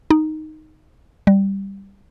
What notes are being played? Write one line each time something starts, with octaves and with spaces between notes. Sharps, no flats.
D#4
G3